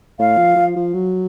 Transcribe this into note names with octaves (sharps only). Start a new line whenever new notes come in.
A2 F5
F3
F3
F3
F#3